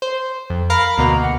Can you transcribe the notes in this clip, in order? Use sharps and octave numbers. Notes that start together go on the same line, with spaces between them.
C5
F2
A#4 F5 A#5 B5
D2 B2 A#3 A#5
F#5